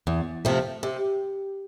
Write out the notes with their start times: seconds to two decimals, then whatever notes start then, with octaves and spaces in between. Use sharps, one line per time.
0.07 E2
0.45 C3 F3 A3
0.83 C3